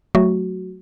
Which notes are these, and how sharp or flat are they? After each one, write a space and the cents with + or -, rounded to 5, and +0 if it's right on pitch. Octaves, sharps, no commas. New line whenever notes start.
F#3 +0 A3 +0 F#4 +0